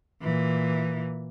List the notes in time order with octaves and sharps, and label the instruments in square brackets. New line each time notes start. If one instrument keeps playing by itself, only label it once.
[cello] A#2 E3